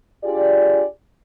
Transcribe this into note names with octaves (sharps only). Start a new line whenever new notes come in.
D4 F4 G4 G#4 D5